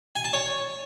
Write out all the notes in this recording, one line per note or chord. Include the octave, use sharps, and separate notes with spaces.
G#5
A5
C#5